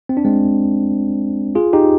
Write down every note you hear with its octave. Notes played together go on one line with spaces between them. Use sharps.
C4
D4
G#3 C4
F4 G#4
D#4 G4